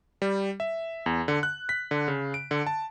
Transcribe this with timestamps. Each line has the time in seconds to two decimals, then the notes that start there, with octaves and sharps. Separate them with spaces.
0.22 G3
0.60 E5
1.06 E2
1.28 D3
1.43 F#6
1.69 B6
1.91 D3
2.08 C#3
2.34 D7
2.51 D3
2.67 A5